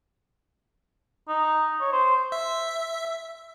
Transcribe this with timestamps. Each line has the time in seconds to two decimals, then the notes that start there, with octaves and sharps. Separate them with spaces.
1.28 D#4
1.81 C#5
1.92 C5
2.32 E5